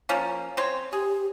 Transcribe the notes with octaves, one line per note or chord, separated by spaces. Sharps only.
F3 A#3 C#4
C4 C5 C#5
G4 G#4